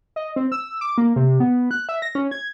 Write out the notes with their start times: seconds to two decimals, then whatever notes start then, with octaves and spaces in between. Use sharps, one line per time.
0.16 D#5
0.36 C4
0.52 E6
0.81 D6
0.98 A#3
1.16 C3
1.40 B3
1.71 F#6
1.89 E5
2.02 A#6
2.15 C#4
2.31 G#6